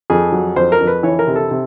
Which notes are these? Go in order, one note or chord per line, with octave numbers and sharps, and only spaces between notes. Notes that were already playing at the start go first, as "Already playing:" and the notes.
F2 G#4
F#3
F2 C5
A#4
F2
B4
E3 C#5
A#4
C3
A4
C3